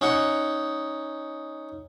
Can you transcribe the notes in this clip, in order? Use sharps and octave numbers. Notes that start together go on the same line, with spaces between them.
C#4 D#4 F#5 C#6